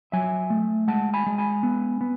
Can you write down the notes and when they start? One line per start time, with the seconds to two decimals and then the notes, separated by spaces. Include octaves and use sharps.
0.12 F#3 E5 G#5
0.50 A3
0.88 G#3 F#5 A5
1.14 G#5 B5
1.26 G#3
1.38 G#5 B5
1.63 B3
2.01 B3